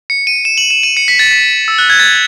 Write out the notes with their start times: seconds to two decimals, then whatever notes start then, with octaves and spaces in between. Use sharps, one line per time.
0.10 C#7
0.27 D#7
0.45 E7
0.58 F#7
0.70 E7
0.83 D#7
0.97 C#7
1.08 B6
1.19 A6
1.31 B6
1.68 E6
1.78 F#6
1.90 G#6
2.00 A6